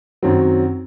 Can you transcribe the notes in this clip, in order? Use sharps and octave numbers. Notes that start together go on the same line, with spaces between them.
F#2 D#3 F#3 C4